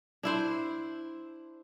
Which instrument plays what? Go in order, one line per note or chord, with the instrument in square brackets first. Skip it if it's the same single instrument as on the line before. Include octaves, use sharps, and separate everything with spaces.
[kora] D4 E4 C5